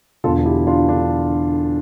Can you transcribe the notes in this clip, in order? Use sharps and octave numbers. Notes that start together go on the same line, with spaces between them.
E1 E2 D3 F4 A4
E4 G4
D4 F4
D3 D4